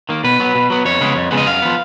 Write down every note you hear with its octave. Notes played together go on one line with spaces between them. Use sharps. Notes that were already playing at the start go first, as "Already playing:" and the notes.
D#3 A#3
B2 B4
F#3 B3
B2
F#3 B3
F2 C#5
C#3 G#3 B3
F2
C#3 G#3 B3
D#5
F#2 F5
F3 B3